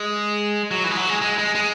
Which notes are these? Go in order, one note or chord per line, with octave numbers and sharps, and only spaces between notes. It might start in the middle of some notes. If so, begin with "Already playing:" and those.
Already playing: G#3
F#3
E3
G#3
F#3
G#3
G#3
G#3
G#3